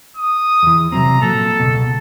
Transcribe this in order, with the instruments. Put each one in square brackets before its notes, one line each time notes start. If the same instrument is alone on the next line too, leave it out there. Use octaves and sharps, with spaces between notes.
[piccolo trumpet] D#6
[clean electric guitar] E2 E3
[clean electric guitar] C3 F#3 C4 [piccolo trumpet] A#5
[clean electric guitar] A#2 F#3 [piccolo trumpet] A4
[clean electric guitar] C#2 G2 B2